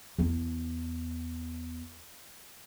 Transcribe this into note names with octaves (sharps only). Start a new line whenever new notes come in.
E2 B3